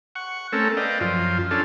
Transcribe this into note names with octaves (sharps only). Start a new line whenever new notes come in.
F#5 C#6
A3 C4 C#4 A4 A#4
B4 D5 D#5 F5 G5
F#2 F3 F4
C#4 D4 F4 A4